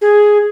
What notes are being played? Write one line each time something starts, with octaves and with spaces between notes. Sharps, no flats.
G#4